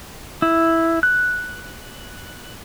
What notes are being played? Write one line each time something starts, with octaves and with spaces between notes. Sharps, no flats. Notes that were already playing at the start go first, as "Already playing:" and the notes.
E4
F#6